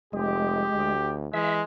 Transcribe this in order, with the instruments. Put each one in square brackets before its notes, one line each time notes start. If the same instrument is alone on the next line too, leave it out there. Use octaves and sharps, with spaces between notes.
[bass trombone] F1 [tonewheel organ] G#3 [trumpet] G4
[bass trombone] D2
[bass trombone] E3 [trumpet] G#3 [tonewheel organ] E5